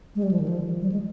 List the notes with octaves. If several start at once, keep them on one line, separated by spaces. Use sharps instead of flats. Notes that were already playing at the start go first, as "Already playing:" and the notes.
G#3
G3
F3
D#3
F3
G3
G#3